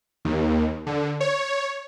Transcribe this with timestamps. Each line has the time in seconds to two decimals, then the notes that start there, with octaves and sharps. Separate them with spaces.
0.25 D#2
0.86 D3
1.20 C#5